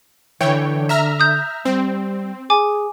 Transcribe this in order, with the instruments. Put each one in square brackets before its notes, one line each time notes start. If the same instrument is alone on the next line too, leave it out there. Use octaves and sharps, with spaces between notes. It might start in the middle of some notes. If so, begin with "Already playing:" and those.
[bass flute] D3 [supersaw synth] E3 C#5 G5
[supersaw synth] E5 A#5 F6
[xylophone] D#6 G6
[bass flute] G3 [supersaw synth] C4
[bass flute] G#4 [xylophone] G#5 D6